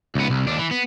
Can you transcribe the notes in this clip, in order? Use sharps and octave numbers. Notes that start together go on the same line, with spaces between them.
C#2 B3
C2
D#2 D4
E3
B3